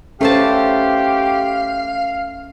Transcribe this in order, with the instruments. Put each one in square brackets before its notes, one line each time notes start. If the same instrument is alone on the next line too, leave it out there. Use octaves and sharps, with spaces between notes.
[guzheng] A3 C5 A5 [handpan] C#4 A4 B4 [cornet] G4 [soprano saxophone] F5